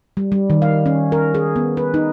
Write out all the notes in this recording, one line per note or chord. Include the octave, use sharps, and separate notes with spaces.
G3
G3
D#3
F5
C#4
A#4
G#4
B3
B4
D#4